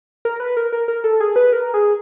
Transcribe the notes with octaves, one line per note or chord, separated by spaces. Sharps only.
A#4
B4
A#4
A#4
A#4
A4
G#4
B4
A#4
G#4